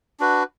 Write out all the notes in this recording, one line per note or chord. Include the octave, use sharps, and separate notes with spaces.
D4 F#4 B4